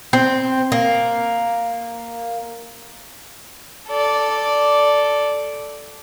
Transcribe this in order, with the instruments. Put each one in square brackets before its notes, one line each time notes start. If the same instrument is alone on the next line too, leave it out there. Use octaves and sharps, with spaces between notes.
[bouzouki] C4
A#3
[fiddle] A4 D5